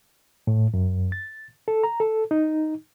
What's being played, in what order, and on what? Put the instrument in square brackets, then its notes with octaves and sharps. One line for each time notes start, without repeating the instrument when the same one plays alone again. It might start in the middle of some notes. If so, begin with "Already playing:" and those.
[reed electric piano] A2
F#2
A6
A4
A#5
A4
D#4